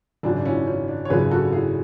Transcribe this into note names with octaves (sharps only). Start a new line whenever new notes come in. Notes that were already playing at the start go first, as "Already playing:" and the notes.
G#1 F#2 C#3 F#3 D4
D4
C#4 E4
C#4
D4
C#5
G#1 F#2 C#3 F#3 G#4 B4
F#4 A4
E4 G#4